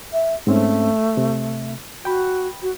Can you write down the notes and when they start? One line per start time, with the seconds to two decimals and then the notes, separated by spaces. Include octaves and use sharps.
0.13 E5
0.47 G#2 A3 C4 C#4
1.17 C3
2.05 F#4 G5 B5
2.62 F#4